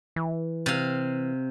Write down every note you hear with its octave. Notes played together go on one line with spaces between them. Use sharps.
E3
C3 F5